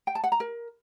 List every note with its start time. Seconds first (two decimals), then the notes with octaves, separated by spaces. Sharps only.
0.07 G5
0.15 A5
0.24 F#5
0.32 A#5
0.40 A#4